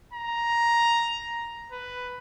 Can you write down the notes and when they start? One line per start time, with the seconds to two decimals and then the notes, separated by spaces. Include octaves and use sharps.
0.13 A#5
1.72 B4